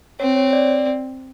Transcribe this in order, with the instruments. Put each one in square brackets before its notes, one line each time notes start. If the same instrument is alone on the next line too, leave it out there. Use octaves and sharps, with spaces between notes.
[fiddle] C4 [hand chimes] C#5
[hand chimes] C#5
D5